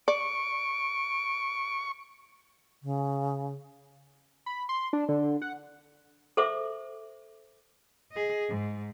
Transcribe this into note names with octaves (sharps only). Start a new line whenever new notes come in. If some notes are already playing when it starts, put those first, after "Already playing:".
D5 C#6 D7
C#3
B5
C6
D4
D3
F#5
A4 C5 E5 D6
G#4 D#5
G#2